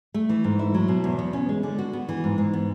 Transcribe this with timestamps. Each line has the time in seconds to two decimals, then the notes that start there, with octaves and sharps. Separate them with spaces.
0.14 A3
0.29 E3
0.44 G#2
0.59 E4
0.74 F#3
0.88 B2
1.04 E2
1.19 B3
1.33 C#4
1.49 G#3
1.63 D3
1.78 F#4
1.93 B3
2.09 E3
2.24 G#2
2.38 G#2
2.53 B3